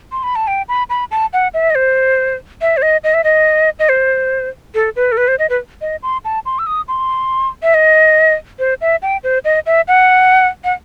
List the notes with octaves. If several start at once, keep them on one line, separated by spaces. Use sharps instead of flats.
C6
B5
A5
G5
B5
B5
A5
F#5
E5
D#5
C5
E5
C5
D#5
D#5
E5
D#5
D#5
C5
A4
B4
A4
B4
C5
D#5
B4
D#5
C6
A5
C6
E6
D#6
C6
E5
D#5
C5
E5
G5
C5
D#5
E5
F#5
F#5